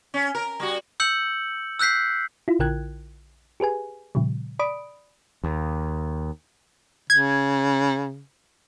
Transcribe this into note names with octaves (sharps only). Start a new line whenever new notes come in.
C#4
A#4
G3 F#4
E6 G6 C#7 F#7
E6 F#6 G6 B6 C7
E4 F4
A#1 D3 A#4 G5 F#6 G#6
G4 G#4 B4 G#5
A#2 C#3 F3 G3
D5 B5 D#6 D7
D#2
C#3 G#6